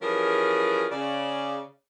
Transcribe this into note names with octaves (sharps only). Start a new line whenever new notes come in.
E3 F3 G3 C#4 G#4 A#4
C#3 D5